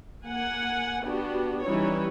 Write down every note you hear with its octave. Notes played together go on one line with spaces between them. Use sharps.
A#3 F#5 G#5
B3 D4 F#4 G4
E3 G3 C#4 D#4 E4 C#5